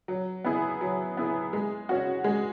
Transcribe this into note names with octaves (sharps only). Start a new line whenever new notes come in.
F#3
B3 E4 G#4
F#3
B3 E4 G#4
G#3
C#4 F#4
G#3